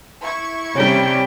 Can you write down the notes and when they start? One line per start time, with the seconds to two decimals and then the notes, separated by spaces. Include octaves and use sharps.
0.21 E4 C#6 G#6
0.75 C3 G3 C#4 G4 G5